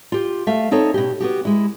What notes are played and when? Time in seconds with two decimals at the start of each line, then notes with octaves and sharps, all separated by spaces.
0.12 F4 G4
0.47 A3 E5 F5
0.71 C4 D#4 A4 C#5
0.94 B2 G4
1.20 B3 F#4 G4
1.45 G#3 E4